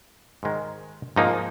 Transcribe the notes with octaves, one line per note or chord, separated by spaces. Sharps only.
G#2 D#3 G#3
G#2 F3 A#3 D#4